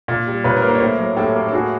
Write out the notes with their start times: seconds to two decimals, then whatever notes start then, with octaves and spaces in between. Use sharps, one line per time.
0.08 A#2
0.27 G3
0.44 A#2 B4 C#5
0.56 A#4 C5
0.62 A#3
0.68 A#4 C5
0.75 C#5
0.80 A2 A#4 C5
0.98 F#3
1.17 A2 G4 A4
1.35 A#3
1.48 A4
1.53 A2 F#4 G#4